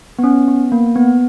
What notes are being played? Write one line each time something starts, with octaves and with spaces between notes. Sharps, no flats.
B3
C#4
B3
A#3
B3